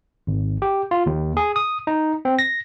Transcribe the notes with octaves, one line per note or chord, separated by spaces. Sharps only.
G#1
G4
F4
D#2
G#4
D#6
D#4
C4
A#6